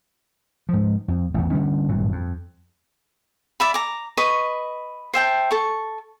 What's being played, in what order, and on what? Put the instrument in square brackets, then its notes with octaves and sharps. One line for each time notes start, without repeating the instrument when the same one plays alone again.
[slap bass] G#2 F3
F2
A1 E2
D3 D#3 G3 C#4
G#1 G2 A#2 F#3
F2
[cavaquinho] D5 E5 B5
A#5 D6
B4 D#5 B5 C#6
C5 E5 G5 A5
A4 C#6